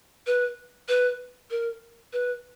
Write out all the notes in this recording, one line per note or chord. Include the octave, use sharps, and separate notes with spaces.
B4
B4
A#4
B4